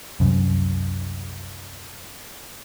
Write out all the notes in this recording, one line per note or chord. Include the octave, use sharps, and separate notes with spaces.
C2 F#2